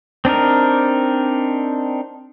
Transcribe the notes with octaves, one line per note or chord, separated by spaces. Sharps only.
C4 D4 D#4 A#4